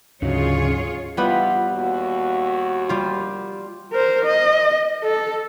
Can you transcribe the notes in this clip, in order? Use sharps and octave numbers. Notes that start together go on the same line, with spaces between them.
D2 G#2 C#3 F#3 F4 G#4 C#5
E3 G3 B3 E4 F4 B4
D#2 F#4
G3 F4
A#4 C5
D#5
A4